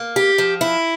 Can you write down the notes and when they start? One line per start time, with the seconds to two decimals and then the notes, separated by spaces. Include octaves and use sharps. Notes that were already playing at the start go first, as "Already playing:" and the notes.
Already playing: A#3
0.16 G4
0.38 F3
0.61 E4